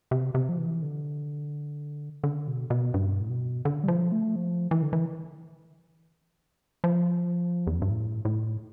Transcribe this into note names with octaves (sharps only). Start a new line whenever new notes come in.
C3
C3
F3
E3
D3
D3
B2
B2
G2
A2
B2
D3
G3
F3
A3
F3
E3
D3
E3
F3
E2
F2
G2
A2
A2